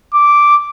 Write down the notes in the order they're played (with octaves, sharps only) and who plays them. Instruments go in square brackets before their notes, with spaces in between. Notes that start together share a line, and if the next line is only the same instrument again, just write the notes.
[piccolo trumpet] D6